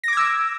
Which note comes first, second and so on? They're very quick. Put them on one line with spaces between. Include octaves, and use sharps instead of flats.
A#6 D6 G#6 E6